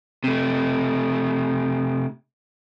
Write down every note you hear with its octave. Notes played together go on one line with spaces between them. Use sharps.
C3 A3